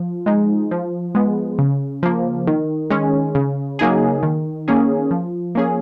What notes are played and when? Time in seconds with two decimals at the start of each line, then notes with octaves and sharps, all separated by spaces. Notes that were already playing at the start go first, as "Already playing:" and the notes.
Already playing: F3
0.26 G#3 D#4
0.71 F3
1.15 G#3 B3
1.59 C#3
2.03 F3 A#3
2.47 D#3
2.90 G#3 C#4
3.35 C#3
3.79 F#3 A#3 D#4 G#4
4.23 D#3
4.68 A#3 C#4 G#4
5.11 F3
5.55 A#3 C#4 G#4